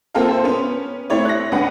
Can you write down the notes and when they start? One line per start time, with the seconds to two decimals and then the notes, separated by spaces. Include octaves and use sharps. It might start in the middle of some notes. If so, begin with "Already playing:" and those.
0.14 A#3 C4 F4 A4 A#4 F5
0.28 C4 C5
0.44 B3 C#4
1.10 A3 C4 E4 C#5 D5
1.25 F#6 A#6
1.52 C#2 D4 B4 F#5